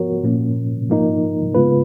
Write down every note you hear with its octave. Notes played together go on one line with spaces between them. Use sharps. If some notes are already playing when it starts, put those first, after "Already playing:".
Already playing: F3 B3 F#4 A#4 C#5
A#2 F3 A#3 C#4
G#2 F3 A#3 D#4 A#4
C#3 G#3 B3 F4 B4